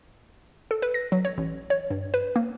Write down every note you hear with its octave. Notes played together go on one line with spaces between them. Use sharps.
A4
B4
A#6
F#3
C#5
A1
C#5
G2
B4
A#3